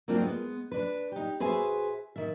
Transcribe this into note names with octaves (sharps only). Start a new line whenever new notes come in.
F#3 A#3 C4 D4 E4 F4
G#3 B3
D4 B4
D#4 G4
F#4 G#4 B4 C5 E5 G#5
D#3 E5